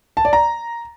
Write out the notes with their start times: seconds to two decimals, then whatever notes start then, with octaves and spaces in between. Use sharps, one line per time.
0.17 A5
0.25 D5
0.33 A#5